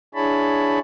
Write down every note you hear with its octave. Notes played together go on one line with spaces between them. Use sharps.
D4 E4 G#4 C#5 A5 B5